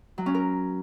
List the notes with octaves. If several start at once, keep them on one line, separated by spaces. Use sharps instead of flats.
F#3
C#4
A#4